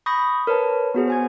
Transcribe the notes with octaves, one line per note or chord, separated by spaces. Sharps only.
B5 C#6 D#6 G6 A#6
A#4 B4 C#5 A5
B3 F#4 G#4 C5
C5 G#5 G#6